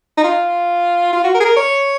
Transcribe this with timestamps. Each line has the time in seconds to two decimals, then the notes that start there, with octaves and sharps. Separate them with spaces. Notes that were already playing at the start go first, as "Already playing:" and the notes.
0.17 D#4
0.24 F4
1.13 F4
1.24 F#4
1.34 A#4
1.40 G#4
1.45 A#4
1.57 C#5